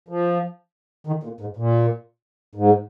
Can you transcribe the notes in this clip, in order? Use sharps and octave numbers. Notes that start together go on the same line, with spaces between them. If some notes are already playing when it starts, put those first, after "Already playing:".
F3
D#3
A#2
G#2
A#2
G#2